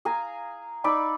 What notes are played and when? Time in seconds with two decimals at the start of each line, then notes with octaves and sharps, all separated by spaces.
0.05 G#4 F5 G#5 A#5
0.84 D#4 D5 B5 E6